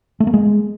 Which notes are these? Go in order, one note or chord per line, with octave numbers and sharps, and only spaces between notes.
A3
A#3
G#3